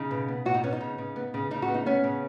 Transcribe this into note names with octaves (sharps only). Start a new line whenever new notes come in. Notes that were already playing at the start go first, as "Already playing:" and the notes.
Already playing: C#3 D#4
B2
B3
B2 F#4
D#4
B3 C#4
D#4
C#3
C#3
B3
C#3
C#3 D#4
F#4
B3
D#4
B3 C#4
C#3